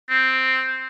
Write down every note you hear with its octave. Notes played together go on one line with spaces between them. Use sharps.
C4